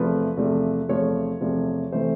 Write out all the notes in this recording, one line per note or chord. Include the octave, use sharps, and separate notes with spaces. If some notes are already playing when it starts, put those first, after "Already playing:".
Already playing: E2 C3 F3 A3 B4
E2 C3 F3 A3
E2 C3 F3 A3 C#5
E2 C3 F3 A3
C3 E3 A3 C5